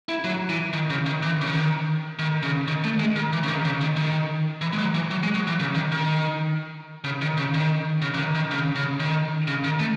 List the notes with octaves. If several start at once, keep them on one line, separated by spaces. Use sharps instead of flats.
E4
F#3
E3
D#3
C#3
D#3
E3
C#3
D#3
D#3
C#3
D#3
A3
G#3
D#3
E3
C#3
D#3
C#3
D#3
D#3
E3
G#3
F#3
E3
F#3
G#3
F#3
E3
C#3
D#3
D#3
C#3
D#3
C#3
D#3
C#3
E3
D#3
D#3
C#3
C#3
D#3
C#3
D#3
A3